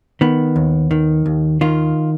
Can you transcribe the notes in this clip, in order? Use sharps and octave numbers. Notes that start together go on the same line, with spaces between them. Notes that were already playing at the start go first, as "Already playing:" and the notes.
D#3 B3
D#2
D#3
D#2
D#3 F4